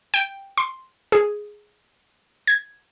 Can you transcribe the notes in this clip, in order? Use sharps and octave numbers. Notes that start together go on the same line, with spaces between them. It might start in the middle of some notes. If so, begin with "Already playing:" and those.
G5
C6
G#4
G#6